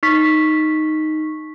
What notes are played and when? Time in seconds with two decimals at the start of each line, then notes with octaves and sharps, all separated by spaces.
0.03 D#4 C#6 B6